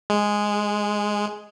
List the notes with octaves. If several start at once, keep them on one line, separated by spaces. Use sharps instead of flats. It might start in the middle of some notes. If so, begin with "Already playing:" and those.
G#3